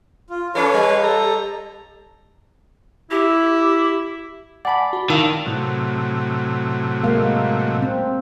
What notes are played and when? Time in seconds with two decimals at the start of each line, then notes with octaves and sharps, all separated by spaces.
0.30 F4
0.55 C#4 A4 B4 C#5 F5
0.74 G3
1.03 A4 A#5
3.11 E4 G4
4.65 D5 F#5 G#5 A5 B5
4.93 F#4
5.10 D#3 E4 F5 A5 E6
5.46 A2 C3 F#3
7.03 G#3 A#3 F5
7.82 C4